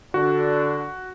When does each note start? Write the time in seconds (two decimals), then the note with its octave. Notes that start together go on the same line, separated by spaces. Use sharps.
0.14 D3 D4 F#4